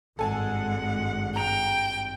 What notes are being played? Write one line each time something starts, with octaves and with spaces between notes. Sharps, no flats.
G#1 G2 G#3 A4 F#5 G#5 A5
G5 A#5 F7